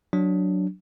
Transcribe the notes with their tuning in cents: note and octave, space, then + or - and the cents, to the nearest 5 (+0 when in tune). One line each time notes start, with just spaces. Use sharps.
F#3 +0 D4 +0